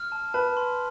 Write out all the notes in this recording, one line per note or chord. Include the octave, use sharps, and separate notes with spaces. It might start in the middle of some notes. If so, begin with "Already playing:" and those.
Already playing: F6
A5
B4 A5
C6